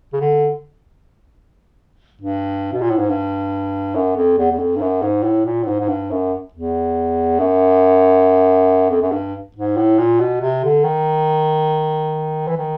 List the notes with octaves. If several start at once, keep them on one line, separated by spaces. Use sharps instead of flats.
C#3
D3
G2
B2
A#2
A2
G#2
G2
F#2
F2
E2
E2
F2
G2
F#2
G#2
A2
A#2
A2
G#2
G#2
G2
F#2
E2
F#2
F2
F#2
G2
G#2
A2
A#2
B2
C3
D3
D#3
E3
D#3